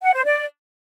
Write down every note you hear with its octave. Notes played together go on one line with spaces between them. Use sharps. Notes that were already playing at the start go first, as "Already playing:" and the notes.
F#5
C5
D5